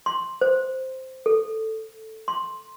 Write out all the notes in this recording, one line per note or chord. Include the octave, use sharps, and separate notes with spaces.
C6
C5
A4
C6